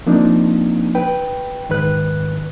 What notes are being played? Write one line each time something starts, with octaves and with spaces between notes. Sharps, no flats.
F3 A#3 C4 D4 D#4
B4 G5
G#2 D#3 B4 F#6